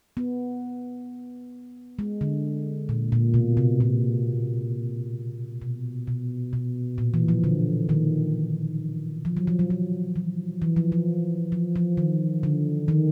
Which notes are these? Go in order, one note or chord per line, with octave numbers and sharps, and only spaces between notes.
B3
G#3
D3
A#2
A#2
B2
C3
A#2
B2
B2
B2
A#2
E3
F3
D3
D#3
F3
F#3
F3
F#3
F3
E3
E3
F3
F3
F3
F3
D#3
D3
D#3